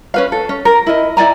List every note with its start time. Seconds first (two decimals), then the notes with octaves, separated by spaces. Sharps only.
0.14 C#4 B4 F5
0.32 A4
0.49 C#4
0.65 A#4
0.87 E4 A#4 D#5
1.17 E4 D5 G#5 A#5